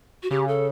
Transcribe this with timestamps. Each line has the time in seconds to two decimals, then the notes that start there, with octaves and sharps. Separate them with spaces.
0.23 F#4
0.30 C#3 G4
0.48 A4